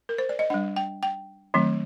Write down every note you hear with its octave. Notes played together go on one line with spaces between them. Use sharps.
A#4
C5
D5
D#5
G3 D4 F#5
G5
G5
D#3 F#3 A3 C4